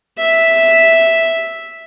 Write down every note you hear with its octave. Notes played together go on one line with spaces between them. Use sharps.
E5